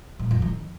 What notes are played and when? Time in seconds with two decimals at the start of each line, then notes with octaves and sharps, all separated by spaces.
0.19 A#2
0.31 F2
0.42 D#3